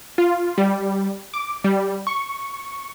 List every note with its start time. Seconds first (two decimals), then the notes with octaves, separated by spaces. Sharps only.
0.18 F4
0.58 G3
1.34 D6
1.64 G3
2.07 C#6